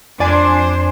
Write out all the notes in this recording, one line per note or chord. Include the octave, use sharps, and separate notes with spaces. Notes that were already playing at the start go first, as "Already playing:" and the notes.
F2 D4 C5 D5 G#5